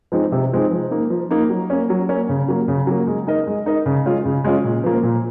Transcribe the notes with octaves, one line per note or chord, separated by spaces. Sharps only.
F3 G#3 C4 D#4
C3
F3 G#3 C4 D#4
F3
A#3 D#4
F3
A#3 D#4
F#3
A#3 C#4
F#3
A#3 C#4
C#3
F#3 A#3
C#3
F#3 A#3
G#3
D#4 A#4 D#5
G#3
D#4 A#4 D#5
C#3
G#3 C#4 F4
C#3
G#3 C#4 F4
A#2
F3 A#3
A#2